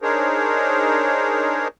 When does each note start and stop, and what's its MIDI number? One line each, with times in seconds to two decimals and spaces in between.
0.02 1.68 62
0.02 1.68 63
0.02 1.68 68
0.02 1.68 70
0.02 1.68 72
0.02 1.68 73